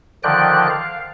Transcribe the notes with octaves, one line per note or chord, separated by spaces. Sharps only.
D3 D#3 F3 D5 G5 F#6
F5